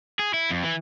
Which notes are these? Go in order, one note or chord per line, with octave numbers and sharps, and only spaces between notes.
G#4
E4
F2
E3